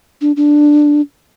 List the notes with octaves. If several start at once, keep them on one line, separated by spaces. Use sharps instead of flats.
D4
D4